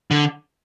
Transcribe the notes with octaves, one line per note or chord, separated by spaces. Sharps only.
D3